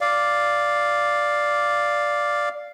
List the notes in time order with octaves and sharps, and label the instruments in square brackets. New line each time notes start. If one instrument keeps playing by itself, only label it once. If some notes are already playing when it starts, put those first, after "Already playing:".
[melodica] D5 F5